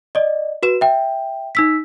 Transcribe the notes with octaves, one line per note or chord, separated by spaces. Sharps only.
D5 D#5
F#4 B4 E7
E5 G5
D#4 E6 B6